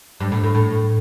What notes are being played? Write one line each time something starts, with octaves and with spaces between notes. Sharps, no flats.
G2
A2
A2
A2